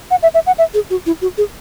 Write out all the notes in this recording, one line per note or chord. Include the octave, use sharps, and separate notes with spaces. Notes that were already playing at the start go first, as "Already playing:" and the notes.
F#5
E5
E5
F#5
E5
G#4
F#4
E4
F#4
G#4